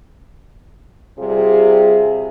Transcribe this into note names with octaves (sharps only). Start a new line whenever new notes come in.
C3 G3 F4 G#4